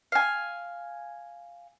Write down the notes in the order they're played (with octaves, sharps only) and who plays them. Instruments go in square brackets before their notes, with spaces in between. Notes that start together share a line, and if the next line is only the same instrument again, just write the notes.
[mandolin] F5 G#5